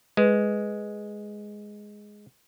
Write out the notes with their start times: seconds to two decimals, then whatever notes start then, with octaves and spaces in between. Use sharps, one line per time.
0.17 G#3 B4